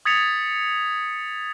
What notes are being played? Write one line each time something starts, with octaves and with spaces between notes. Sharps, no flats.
D#6 G#6 A6 B6 C#7 F7